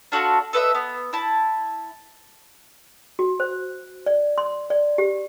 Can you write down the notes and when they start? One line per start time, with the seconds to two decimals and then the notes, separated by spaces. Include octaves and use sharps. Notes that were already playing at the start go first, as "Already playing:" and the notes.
0.12 D4 F4 F#4 A4
0.53 A4 B4 D#5 E5
0.75 B3
1.13 E4 A5
3.19 F#4
3.40 C5
4.06 D5
4.38 C6
4.70 D5
4.98 G4